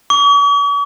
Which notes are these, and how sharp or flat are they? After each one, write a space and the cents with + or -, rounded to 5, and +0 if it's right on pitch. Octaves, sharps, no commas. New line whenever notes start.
C#6 +45